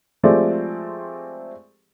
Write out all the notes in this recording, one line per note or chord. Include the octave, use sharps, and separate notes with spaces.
F3 G#3 A3 C4 G4 D5